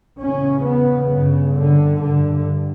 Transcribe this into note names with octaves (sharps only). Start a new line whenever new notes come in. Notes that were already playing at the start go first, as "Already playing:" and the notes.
E2 C#3 C#4
B3
G2 C#3
D3
G2 D3